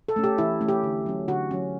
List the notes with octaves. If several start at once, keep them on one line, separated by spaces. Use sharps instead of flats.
A4
A3 C#4
G4
E3 E4
A3 C#4
G4
D3
F#3 C#4
D3 F#4
F#3 C#4